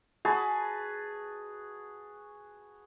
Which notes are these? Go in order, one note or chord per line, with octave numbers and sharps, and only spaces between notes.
F#4 G#4 B4 A5